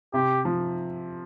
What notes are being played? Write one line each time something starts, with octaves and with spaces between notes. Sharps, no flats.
C3 G4
F3